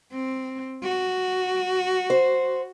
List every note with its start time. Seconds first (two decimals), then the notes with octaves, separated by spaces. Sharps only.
0.13 C4
0.83 F#4
2.10 C5